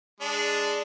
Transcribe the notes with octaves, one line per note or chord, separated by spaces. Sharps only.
G#3 D4